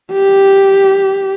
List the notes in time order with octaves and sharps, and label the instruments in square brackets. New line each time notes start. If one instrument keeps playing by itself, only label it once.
[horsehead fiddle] G4